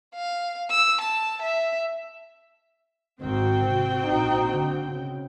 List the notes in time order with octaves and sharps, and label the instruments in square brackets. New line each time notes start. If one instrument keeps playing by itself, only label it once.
[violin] F5
E6
A5
E5
[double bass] G#1 D#3 [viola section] C4 F#4 G5
[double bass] C3
A#1 D#4
D3
C#3